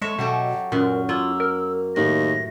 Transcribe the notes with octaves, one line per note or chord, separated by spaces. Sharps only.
G#3 A4 C#5 E5
B2 F#3 G4 A4
F#2 A#2 A#4
A#3 F4 E6
A#4
D#2 A2 A#6